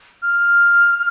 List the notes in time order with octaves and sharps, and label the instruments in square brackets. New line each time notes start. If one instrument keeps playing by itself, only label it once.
[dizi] F6